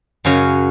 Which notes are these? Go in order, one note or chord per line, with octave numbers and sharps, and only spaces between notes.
F#2 C#3 F#3 F#4